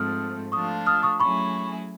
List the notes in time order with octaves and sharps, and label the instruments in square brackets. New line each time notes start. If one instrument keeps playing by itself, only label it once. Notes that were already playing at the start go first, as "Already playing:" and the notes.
Already playing: [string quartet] G#2 F3 A3 C4 [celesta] D#6 F6
[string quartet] F3 A3 D4 F4 [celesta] C#6 D#6
[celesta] D#6 F6
C#6 D#6
[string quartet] F#3 A3 C#4 E4 G#4 [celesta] B5 C#6